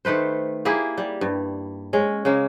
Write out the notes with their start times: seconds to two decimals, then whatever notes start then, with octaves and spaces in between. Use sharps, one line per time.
0.05 D#3 A3 B4 C5
0.65 A#3 E4 G4 G#4
0.98 G3
1.21 G2
1.93 G#3 C#4
2.25 C#3 G#3 A#3